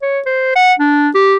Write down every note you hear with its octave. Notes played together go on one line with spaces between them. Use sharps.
C#5
C5
F#5
D4
G4